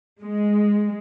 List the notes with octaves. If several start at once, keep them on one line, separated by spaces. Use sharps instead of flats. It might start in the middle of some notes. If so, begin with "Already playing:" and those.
G#3